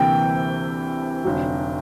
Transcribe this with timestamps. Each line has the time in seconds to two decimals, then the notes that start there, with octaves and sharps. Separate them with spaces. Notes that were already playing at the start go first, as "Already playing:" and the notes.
Already playing: D2 C3 E3 G3 A#3 G5
1.25 F1 F2 D3 F#3